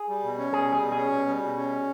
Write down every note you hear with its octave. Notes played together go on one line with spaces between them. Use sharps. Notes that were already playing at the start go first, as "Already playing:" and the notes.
Already playing: G#4
G3
B2
C#4
B2 G#4
G3
G#4
B2
C#4 G#4
B2
G3
B2
C#4